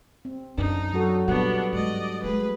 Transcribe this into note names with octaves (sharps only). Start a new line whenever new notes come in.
C4
F#2 D4 D#4
F#3 F#4 A4
A#2 G3 B3 D4 F#4 F#5
G#2 D5 D#5
G#3 A3 G#4 B4